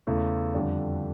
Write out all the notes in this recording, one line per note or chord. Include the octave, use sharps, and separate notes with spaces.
E2 C#3 E3 A3
F2 D3 G3 D4